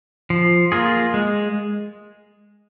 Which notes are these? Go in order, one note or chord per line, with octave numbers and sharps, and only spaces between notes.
F3
A#3 F4 G#4
G#3